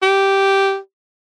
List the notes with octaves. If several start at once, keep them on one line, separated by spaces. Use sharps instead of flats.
G4